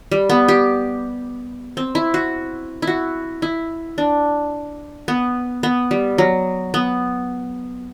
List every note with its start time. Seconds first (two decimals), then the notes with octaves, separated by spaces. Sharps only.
0.11 G3
0.30 B3
0.48 G4
1.77 C4
1.95 E4
2.14 F#4
2.82 E4
2.87 F#4
3.42 E4
3.98 D4
5.08 B3
5.63 B3
5.91 G3
6.18 F#3
6.74 B3